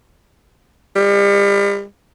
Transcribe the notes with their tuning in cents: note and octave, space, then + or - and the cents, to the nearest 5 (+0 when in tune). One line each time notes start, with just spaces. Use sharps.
G3 +40